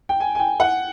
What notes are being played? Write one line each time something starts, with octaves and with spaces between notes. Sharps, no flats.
G5
G#5
G#5
G5
F#5